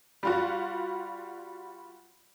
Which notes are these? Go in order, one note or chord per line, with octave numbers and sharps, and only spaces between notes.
G3 F4 F#4